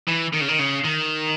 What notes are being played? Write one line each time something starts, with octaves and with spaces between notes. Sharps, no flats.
E3
D#3
C#3
D#3
C#3
D#3